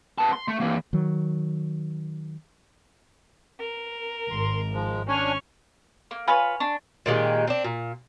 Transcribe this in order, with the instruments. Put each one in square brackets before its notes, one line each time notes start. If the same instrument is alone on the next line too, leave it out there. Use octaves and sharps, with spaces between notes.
[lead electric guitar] B3 A5
C6
A3
E3 A#3
[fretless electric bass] D#3 F#3
[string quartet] A#4
[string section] G#1 [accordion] C6
[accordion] F3 G#3
[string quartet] C#4 C#6 F6 [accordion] D4 C#5 G#5
[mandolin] A#3
[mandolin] F4 B4 C#5 [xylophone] G#5 B5
[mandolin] D4 [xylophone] C#6
[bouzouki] A#2 D#3 G#3 G4
C4 D4
A#2